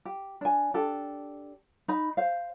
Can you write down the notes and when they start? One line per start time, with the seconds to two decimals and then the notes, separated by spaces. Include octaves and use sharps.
0.05 G4
0.41 D4 G#5
0.74 D4 G4 A4
1.88 D#4 B5
2.17 C5 F5